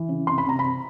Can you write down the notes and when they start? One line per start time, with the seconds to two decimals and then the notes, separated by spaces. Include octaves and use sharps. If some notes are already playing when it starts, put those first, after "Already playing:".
Already playing: E3
0.09 C#3
0.27 C3 C6
0.38 B5
0.45 C3 A#5
0.59 C3 B5